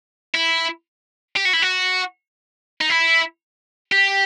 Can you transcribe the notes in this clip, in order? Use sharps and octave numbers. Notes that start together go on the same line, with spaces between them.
E4
G4
F#4
E4
F#4
D#4
E4
G4